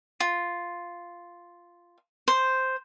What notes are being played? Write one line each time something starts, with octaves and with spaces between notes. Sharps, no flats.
F4
C5